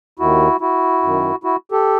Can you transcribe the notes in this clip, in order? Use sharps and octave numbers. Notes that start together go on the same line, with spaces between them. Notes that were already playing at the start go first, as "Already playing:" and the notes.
D#2 D#3 E4 F#4
E4 F#4
F#2 D#3
E4 F#4
G4 A4